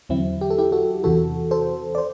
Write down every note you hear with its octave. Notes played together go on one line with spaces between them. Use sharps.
E2 D3 F#3 C4 E4
G4
A4
E4 G4
F#4 A4
E2 C3 E3 F#4 A4
A4 C5
D5
C5